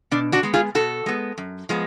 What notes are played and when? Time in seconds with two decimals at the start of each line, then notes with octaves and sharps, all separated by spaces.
0.11 B2 D4
0.32 D4 F#4
0.43 G#3 B3
0.54 F4 G#4
0.75 B2 F#4 A4
1.06 G#3 B3
1.38 F#2
1.69 F3 G#3 B3